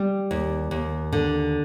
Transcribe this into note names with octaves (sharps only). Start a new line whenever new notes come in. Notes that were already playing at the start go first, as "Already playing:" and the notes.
Already playing: G3
D#2
D#2
D3